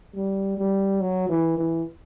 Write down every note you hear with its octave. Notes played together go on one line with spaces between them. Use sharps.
G3
G3
F#3
E3
E3